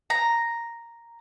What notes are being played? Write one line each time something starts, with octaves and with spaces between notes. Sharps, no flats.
A#5